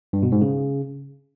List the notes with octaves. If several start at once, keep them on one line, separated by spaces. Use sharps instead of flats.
G2
B2
G#2
C#3